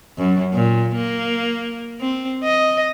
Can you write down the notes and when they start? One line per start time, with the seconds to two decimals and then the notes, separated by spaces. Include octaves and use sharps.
0.18 F#2
0.54 A#2
0.95 A#3
2.01 C4
2.43 D#5